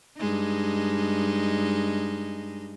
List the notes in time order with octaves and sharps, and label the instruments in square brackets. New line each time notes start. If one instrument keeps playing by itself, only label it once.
[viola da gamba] G2 G#3 D#4